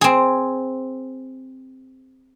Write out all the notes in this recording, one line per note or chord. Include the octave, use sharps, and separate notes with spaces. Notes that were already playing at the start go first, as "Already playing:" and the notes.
C4 G#4